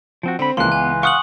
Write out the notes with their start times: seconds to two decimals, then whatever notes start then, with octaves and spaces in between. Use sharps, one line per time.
0.23 F3 C4 F#4
0.39 D3 C4 B5
0.57 C#2 E3 F3 A#3 C#4 C6 F#6
0.72 B3 G#5
1.03 F5 F#5 C#6 D#6 F6 F#6 C#7 F#7